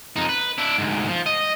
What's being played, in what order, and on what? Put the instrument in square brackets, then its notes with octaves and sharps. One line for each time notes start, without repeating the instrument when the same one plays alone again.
[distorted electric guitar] F2 D#4
B4
D4 E4
D2 G#2
F3
D#5